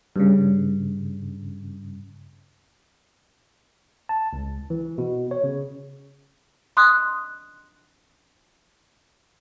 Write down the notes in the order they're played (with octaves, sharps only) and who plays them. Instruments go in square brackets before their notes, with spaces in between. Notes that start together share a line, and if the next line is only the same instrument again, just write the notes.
[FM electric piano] G2 C#3
[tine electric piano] A5
C#2
E3
B2
C#5
C#3
[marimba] C6 D#6 F#6